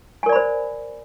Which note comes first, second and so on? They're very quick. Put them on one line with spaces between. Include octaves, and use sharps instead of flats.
G#5 A#4 D5 B5 C5